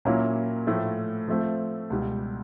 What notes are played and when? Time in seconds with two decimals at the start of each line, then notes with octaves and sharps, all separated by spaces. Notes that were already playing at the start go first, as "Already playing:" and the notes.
0.05 A#2 F#3 A#3 C#4 E4
0.67 A2 F3 A3
1.28 F3 A3 C4
1.90 C#2 B2 G3